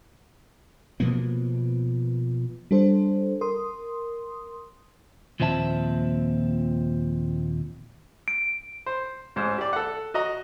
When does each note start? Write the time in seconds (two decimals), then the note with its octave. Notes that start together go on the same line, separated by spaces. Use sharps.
1.00 B2 F3 A#3 B3
2.71 G3 D4 A4 C5
3.41 A#4 C6 D#6
5.40 D#2 A#2 F3 C4 E5 A5
8.28 D7
8.86 C5
9.36 A1 G#2 C5
9.58 G4 D5
9.73 A4 F#5
10.14 F#4 D#5 A#5